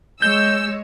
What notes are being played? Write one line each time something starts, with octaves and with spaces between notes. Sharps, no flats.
G#3 C#5 E6 G6